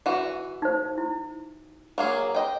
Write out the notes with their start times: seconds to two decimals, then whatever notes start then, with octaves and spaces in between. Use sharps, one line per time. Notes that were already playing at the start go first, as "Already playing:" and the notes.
0.06 E3 F#4
0.62 D#4 C5
0.98 E4
1.98 F#3 A#3 G#4
2.35 D#5 G5